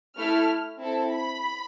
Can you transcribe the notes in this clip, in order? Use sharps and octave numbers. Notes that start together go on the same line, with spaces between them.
A3 E4 A4 F6
C4 E4 A4
B5